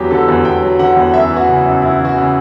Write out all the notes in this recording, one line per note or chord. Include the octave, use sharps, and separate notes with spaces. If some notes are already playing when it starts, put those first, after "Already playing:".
Already playing: E2 F#3 G4
D3 A4
E2
E2 G5
F#3
D3 F#5
E2
F#2 E5
E3
F#4
C#3
F#2
F#2 E4
E3
F#4
C#3